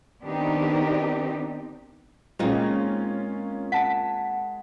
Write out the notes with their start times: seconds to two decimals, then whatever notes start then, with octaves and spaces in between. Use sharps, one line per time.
0.23 D#3 B3 C4 D4 D#4 G4
2.39 A#2 G#3 C4 C#4 D#4 F4
3.72 F#5 A5 B6